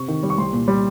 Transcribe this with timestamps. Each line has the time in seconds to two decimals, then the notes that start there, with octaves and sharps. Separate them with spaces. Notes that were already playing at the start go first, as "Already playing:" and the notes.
Already playing: C3 C#6
0.08 D#3
0.23 G3
0.30 C#6
0.38 C2 C6
0.53 A#2
0.68 G3